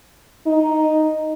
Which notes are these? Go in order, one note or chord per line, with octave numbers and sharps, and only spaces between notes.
D#4